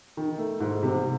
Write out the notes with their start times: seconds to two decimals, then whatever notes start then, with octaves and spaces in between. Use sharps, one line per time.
0.17 D#3
0.38 A3
0.60 G#2
0.83 C3